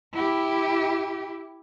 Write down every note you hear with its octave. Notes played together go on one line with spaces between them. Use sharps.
E4 G4